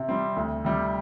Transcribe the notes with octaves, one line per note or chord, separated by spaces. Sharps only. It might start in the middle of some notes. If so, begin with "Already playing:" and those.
Already playing: C3
G3 C4
D2
C3 G3